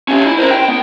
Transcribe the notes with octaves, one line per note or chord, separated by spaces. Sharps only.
C#4 G4
E4
A#4 C5
G5
B3